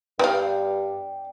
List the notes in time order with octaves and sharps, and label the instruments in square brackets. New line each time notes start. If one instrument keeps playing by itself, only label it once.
[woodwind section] G2 [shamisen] B3 F5 [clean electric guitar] D5 G5